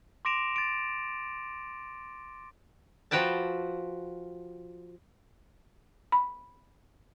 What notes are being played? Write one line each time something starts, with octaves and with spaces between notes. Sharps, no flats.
C6 D6 A#6 D7 E7 F7
A6 D7
F3 F#4 B4 G5 A5
B5